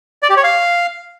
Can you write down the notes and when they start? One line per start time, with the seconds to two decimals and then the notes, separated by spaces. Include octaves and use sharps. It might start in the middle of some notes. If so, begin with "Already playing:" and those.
0.23 D5
0.30 G4
0.37 C#5
0.44 F5